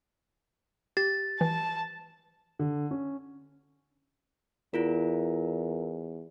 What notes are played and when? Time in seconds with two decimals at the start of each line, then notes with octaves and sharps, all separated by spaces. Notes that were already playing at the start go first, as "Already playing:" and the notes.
0.97 G4 A6
1.41 E3 A5
2.59 D3
2.91 C#4
4.74 E2 E4 F4 A#4